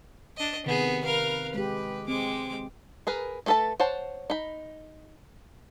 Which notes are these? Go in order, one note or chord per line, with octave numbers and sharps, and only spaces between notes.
D4 D#5
C3 D#3 B3 G#4
A#4 B4 F5
G#3 G4 B4
G#3 C4 D6
G#4 A#4 B4
A3 C#4 A4 B4 A5
C5 C#5 F#5 A5
D#4 B5